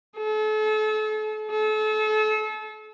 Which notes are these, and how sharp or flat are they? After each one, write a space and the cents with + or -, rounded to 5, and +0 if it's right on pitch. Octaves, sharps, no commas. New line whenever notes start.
A4 -40
A4 -35